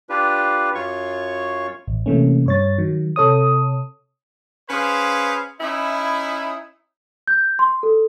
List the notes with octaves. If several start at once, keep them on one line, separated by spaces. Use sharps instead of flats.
D4 F4 G4 B4
F#2 F4 C#5 C#6
A1
C3 E3 A3 A#3 C#4
G2 C#5 A6
D#3 F#3
C3 A4 C#5 D#6
C#4 G#4 B4 C5 F5
C#4 D#4 E4
G6
C6
A4